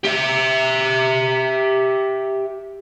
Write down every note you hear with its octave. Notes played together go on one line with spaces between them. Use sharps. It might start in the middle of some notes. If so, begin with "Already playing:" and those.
G4 E5